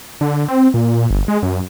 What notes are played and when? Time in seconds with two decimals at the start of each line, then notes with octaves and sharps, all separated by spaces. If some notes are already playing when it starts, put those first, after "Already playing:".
0.21 D3
0.48 C4
0.74 A#2
1.10 G1
1.28 G#3
1.43 F#2